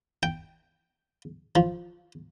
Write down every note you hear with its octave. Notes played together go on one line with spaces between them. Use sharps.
G5
F3